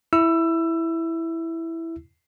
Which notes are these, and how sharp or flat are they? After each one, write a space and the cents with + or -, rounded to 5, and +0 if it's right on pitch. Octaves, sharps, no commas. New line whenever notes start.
E4 +0 E6 +20